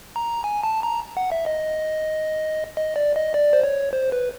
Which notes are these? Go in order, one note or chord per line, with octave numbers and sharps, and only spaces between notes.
A#5
G#5
A5
A#5
F#5
E5
D#5
D#5
D5
D#5
D5
C5
C#5
C5
B4